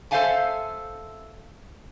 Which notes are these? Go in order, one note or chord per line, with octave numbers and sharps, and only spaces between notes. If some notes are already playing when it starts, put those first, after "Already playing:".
A4 C5 E5 F5 G#5 A5